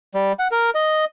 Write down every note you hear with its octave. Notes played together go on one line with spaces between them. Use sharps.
G3
F#5
A#4
D#5